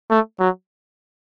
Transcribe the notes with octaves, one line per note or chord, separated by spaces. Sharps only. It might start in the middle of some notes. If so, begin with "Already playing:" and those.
A3
F#3